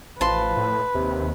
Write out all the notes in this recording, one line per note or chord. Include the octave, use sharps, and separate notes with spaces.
A1 F3 B4 A5 C6
A2
D#2 C3